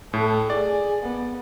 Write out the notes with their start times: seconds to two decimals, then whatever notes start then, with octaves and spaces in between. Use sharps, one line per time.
0.13 A2 A4
0.50 G#4 D5
1.03 B3